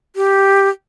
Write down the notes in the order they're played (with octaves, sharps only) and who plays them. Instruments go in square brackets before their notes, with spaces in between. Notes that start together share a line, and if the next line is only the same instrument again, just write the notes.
[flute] G4